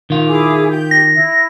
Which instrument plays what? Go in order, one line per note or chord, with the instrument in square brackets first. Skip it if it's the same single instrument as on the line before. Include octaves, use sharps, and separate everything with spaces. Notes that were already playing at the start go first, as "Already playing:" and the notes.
[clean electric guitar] D#3 F4
[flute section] E4 G#4 D6
G4 G6
[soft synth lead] A#6
[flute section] E4